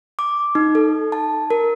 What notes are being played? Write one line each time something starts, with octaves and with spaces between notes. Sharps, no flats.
D6
D#4
A4
A5
A#4